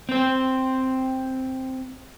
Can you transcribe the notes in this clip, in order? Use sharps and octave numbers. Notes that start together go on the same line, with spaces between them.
C4 C5